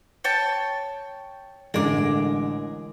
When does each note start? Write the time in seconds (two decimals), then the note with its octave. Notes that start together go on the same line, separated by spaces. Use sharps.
0.24 C#5 G5 A5
1.74 A1 D3 G#3 A#4 D6